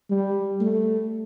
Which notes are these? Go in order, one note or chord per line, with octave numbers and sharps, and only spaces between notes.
G3
A3